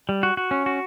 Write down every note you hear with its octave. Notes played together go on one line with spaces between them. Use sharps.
G3
F#4
F#4
C#4
F#4